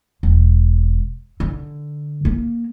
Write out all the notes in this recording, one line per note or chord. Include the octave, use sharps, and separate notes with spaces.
E1
D3
A#3